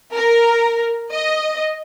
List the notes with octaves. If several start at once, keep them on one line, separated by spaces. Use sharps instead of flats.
A#4
D#5